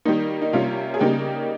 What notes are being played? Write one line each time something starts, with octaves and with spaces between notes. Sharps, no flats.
D#3 G3 A#3 D#4
D#4
C3 G3 A#3 C#4 F4
G#4
C#3 G3 A#3 D#4 G4